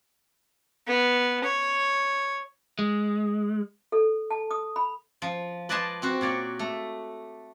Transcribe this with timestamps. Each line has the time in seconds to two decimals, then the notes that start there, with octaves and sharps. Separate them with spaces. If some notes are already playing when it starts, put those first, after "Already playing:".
0.88 B3
1.44 C#5
2.79 G#3
3.92 A4
4.31 A5
4.51 D#6
4.76 B5
5.22 F3
5.69 B4 D5 D#5 G#5 A5 C6
6.02 C4 F#4 C5
6.21 A#2 C#5 D5
6.59 A3